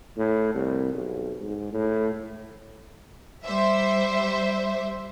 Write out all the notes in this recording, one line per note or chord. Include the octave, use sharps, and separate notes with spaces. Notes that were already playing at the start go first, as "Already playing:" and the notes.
A2
C2
B1
G#2
A2
G3 C5 E5